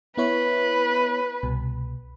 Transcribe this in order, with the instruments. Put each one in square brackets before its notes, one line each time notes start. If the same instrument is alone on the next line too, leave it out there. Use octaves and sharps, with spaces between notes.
[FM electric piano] B3 E4 C#5 [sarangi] B4
[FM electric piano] C2 B2